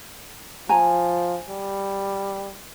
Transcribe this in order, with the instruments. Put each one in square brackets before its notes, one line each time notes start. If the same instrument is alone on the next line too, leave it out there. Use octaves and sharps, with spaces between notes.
[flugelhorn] F3 [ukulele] G#5 A#5
[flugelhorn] G3